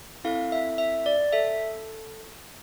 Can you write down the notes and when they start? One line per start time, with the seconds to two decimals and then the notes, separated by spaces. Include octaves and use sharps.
0.25 C4 E4 A4 F5
0.52 E5
0.78 E5
1.06 D5
1.33 A4 E5